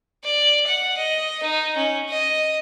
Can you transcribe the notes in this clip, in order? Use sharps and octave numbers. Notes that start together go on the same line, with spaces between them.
D5
F#5
D#5
D#4
C#4
D#5